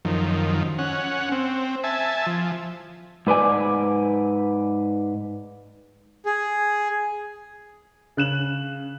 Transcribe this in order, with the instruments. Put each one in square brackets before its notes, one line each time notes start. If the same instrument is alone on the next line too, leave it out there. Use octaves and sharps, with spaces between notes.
[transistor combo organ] F#2 D#3 F3
C#4 F#5
C4
E5 G#5 A5
F3
[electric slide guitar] G#2 B4 D5 G#5
[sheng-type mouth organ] G#4
[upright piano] C#3 F#6 E7 F#7